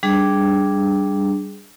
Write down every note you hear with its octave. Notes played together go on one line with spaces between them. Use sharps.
G3 D4 G#4